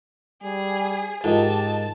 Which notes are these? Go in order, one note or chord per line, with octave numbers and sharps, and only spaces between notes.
G3 G#4
G#2 F4 G4 A#4 D#5 A5